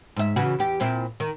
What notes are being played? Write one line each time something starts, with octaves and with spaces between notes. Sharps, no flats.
G#2 E5
C#3 E3 F#4
E2 G4
A#2 C4 E4
D#3